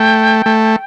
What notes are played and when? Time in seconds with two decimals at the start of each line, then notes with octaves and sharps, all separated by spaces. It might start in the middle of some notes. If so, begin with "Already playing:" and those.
Already playing: A3 G5
0.46 A3